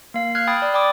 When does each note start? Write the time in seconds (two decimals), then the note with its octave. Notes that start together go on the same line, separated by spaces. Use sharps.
0.14 A#3 F5
0.35 F6 F#6 G#6 C7
0.47 G5 B5 D#6 G#6 A6
0.62 D5
0.74 D5 G5 B5 D6 D#6